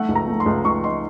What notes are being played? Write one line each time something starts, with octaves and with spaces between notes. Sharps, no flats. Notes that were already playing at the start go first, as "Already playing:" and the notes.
Already playing: A3 F#5
C#2
A#5
A3
C6
C#2
C#2 C#6
D#4 C6